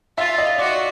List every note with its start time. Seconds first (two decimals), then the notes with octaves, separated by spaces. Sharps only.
0.18 F4 E5
0.38 D#5
0.58 F#4 D5